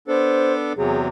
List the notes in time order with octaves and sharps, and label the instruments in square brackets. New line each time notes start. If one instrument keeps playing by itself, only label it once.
[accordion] B3 D4 A4 [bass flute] C5
[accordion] E2 C3 F#3 [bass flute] G#4